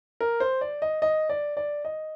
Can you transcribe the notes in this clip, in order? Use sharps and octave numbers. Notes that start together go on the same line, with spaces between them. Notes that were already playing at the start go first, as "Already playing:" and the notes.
A#4
C5
D5
D#5
D#5
D5
D5
D#5